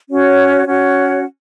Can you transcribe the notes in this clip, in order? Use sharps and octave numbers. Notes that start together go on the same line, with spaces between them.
C#4 F#4 C#5 F#5
C#4 F#4 C#5 F#5